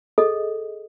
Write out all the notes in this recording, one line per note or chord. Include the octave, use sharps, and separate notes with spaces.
G#4 A4 D#5